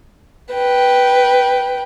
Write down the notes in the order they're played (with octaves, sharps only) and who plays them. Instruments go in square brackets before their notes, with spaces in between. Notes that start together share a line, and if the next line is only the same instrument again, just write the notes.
[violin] B4 G5